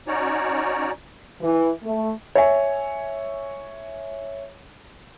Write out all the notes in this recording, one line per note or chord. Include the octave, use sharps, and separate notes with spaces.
C#4 D#4 F#4 C#5 D5
E3
A3
C#5 E5 G#5